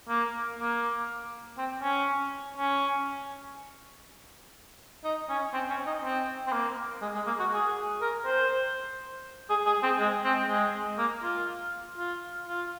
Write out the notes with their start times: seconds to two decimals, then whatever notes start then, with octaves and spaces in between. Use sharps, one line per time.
0.09 A#3
0.59 A#3
1.58 C4
1.82 C#4
2.57 C#4
5.04 D#4
5.29 C#4
5.53 C4
5.70 C#4
5.87 D#4
6.03 C4
6.47 C4
6.52 A#3
7.02 G#3
7.15 G#3
7.27 A#3
7.39 F#4
7.52 G#4
8.02 A#4
8.26 C5
9.50 G#4
9.66 G#4
9.83 C4
10.00 G#3
10.24 C4
10.49 G#3
10.98 A#3
11.23 F4
11.98 F4
12.48 F4